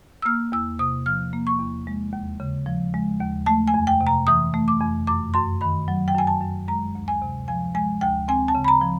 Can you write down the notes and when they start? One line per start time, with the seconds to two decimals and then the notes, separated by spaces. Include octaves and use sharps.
0.22 E6
0.25 A#3 F6
0.52 E2 E6
0.79 C3 D#6
1.06 F3 F6
1.33 A#3
1.47 C#6
1.59 E2
1.87 G#3
2.13 D#2
2.40 C#3
2.66 F3
2.94 G#3
3.20 D#2
3.46 A3 A5
3.68 G#5
3.74 F2
3.87 G5
4.01 C3
4.07 A#5
4.27 E3 D#6
4.54 A3
4.68 D6
4.81 F2
5.07 F#2 D6
5.34 F#2 C6
5.61 D#3 B5
5.88 F#3
6.08 G5
6.15 F#2 G#5
6.27 A5
6.41 F#2
6.68 G#3 A#5
6.95 D2
7.08 G#5
7.22 C3
7.48 F3 G#5
7.75 G#3 G#5
8.01 D2 G5
8.28 C4 G#5
8.48 A5
8.55 C#3
8.64 B5
8.68 A#5
8.82 F3